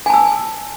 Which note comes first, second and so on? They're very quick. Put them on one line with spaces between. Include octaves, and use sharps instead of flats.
G#5 A5 E6